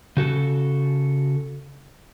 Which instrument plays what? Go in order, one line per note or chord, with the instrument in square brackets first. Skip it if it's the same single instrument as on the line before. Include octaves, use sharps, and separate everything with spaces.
[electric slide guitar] C#3 F#4 A4